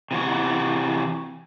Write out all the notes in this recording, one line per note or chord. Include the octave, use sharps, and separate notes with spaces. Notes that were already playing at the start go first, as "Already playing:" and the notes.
C3 E3 F#4